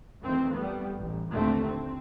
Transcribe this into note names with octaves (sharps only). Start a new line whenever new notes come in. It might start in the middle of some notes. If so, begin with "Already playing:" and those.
F2 D#3 E3 A3 C4
G3 A3 B3
A1
D#2 A#2 D3 A3 C4
C4